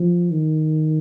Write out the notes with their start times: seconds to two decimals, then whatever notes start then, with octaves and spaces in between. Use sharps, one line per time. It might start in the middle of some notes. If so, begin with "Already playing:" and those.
Already playing: F3
0.31 D#3